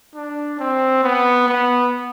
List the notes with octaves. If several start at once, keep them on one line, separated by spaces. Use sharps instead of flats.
D4
C4
B3
B3